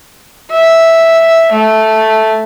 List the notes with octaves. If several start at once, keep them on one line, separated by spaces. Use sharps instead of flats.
E5
A3